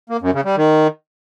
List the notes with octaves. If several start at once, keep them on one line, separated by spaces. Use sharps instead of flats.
A#3
F#2
C#3
G3
D#3